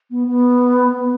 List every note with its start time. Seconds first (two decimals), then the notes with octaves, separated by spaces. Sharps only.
0.11 B3
0.27 B3
0.94 B3